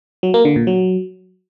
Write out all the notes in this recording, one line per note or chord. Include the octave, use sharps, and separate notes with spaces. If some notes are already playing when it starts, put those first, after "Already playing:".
F#3
A#3
D3
A#2
F#3